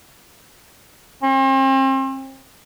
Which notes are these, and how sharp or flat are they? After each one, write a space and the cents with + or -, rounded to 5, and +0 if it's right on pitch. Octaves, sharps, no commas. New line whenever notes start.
C4 +40